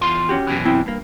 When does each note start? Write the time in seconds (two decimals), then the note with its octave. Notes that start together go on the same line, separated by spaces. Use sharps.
0.01 E2 F4 C6
0.29 C#4 F#4 G4
0.47 F#2 B2 E3
0.65 C4 E4 G5
0.86 G2 A#3